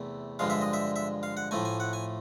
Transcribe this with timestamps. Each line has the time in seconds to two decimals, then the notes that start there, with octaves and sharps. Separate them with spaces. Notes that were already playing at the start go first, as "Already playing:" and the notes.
Already playing: E2 C3 E3 A3
0.39 G2 D3 F3 G#3 F5
0.50 E5
0.61 D#5
0.73 E5
0.96 E5
1.23 F5
1.37 F#5
1.51 A2 F3 A3 G#5
1.65 G#5
1.80 F#5
1.93 G#5